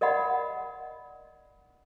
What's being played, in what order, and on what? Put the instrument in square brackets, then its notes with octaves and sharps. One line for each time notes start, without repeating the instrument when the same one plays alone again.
[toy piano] A#4 D5 D#5 F#5 B5